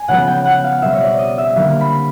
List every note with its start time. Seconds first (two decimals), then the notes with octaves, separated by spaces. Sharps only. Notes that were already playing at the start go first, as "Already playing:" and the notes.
Already playing: G#5
0.08 C#3 F3 G#3 B3 F#5
0.27 G5
0.45 F#5
0.64 F5
0.82 B2 G3 C4 E5
0.93 C#5
1.01 D5
1.19 D#5
1.38 E5
1.56 D3 G3 A#3 F5
1.81 B5